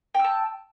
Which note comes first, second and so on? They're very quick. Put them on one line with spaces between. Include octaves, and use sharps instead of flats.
G5 E6 A5